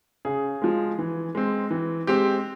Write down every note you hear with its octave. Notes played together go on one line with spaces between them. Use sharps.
C#3 G#4
F3 G#3
E3
G#3 C4
E3
G#3 C4 G4